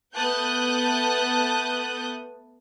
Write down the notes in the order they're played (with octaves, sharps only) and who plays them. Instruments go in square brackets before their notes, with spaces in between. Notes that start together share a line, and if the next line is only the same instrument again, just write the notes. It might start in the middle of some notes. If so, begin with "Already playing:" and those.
[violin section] A3 B3 A5 D#6 F#6 G6